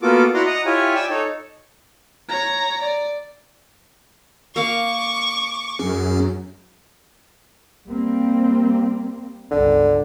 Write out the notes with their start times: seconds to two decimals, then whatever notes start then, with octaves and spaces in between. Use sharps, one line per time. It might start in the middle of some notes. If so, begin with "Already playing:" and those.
0.02 A#3 B3 F4 F#4 A4 D6
0.34 E4 F#4 D5 F#5 A#5 C6
0.46 D#5 F#5 A#5 D#6
0.66 E4 F4 G4 C#5 G#5
0.95 D5 G5 G#5 E6
1.10 D#4 A4 C#5
2.29 C#5 A#5
2.82 D5
4.56 A#3 F5 C#6 D6
5.79 F#2 C#4 G#4
7.87 G3 A#3 C4
9.51 G1 C#2 D3